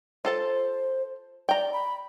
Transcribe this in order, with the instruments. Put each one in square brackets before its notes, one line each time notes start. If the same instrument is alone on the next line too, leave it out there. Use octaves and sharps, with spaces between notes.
[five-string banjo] F4 A4 A5 [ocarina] C5
[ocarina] D5 [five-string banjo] G5 A#5
[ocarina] B5